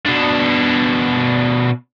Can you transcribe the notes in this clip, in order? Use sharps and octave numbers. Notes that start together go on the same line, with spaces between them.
B2 D4